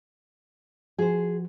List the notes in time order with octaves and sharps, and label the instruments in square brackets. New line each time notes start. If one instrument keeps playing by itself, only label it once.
[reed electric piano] F3 F#4 [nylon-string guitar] G#4 C5